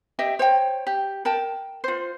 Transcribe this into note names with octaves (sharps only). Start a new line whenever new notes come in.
G4 D#5 E5 G5
C5 C#5 G5
G4
A#4 G5 A5
F4 C5